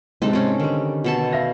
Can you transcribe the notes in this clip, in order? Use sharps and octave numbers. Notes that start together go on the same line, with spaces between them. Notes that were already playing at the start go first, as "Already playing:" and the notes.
G#2 C3 G#3 C4 D#4 A4
C4 C#4
D3 D#3 G3
B2 A4 A5
E5 F5 A#6